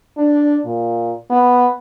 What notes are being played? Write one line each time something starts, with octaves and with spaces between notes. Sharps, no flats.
D4
A#2
B3